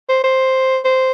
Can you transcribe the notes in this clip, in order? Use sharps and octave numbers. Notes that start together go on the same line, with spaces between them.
C5
C5
C5